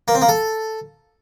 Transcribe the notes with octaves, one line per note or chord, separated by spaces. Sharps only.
A#3
C4
A#3
A4